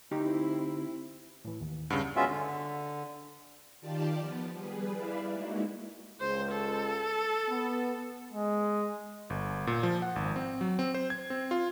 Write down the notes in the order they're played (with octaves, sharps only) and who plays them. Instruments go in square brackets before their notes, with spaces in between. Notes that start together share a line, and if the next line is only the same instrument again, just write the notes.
[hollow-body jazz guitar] D2 D#4 G4 [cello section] C4 E4
[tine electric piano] A2 E3
D#2
[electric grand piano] G2 C#3 [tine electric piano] F#5
[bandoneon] G#3 B3 C#4 F4 F#4 E5
D3
[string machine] D#3 F4 G4 D5 A5
F3 B3
G3 G#4 B4
E4 B4 D5 E5 F5
G#3 A#3 D#4 E4 F#4
[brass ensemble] C#2 G#3 [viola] C5
[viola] A4
[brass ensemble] B3
[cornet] G#3
[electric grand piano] G1
A#2
F3
F#5
G#1
C4
F#3
C4
C5
G#6
C4
F4